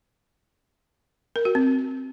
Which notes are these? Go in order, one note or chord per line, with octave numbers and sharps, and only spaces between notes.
A#4
F#4
C4